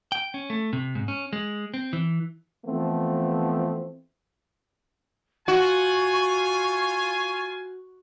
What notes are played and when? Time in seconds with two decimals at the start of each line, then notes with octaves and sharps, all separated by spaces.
0.12 G5
0.34 C#4
0.50 A3
0.73 C3
0.95 G#2
1.08 C#4
1.33 G#3
1.74 C4
1.93 E3
2.65 E3 F3 A3 B3 C4
5.48 F4 F#4 G#5 C#6